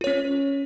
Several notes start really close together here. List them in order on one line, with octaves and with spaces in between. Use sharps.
F4 C#5 C#4